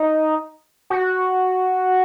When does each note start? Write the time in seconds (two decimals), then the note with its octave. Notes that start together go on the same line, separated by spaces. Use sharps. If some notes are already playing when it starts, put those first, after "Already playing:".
Already playing: D#4
0.90 F#4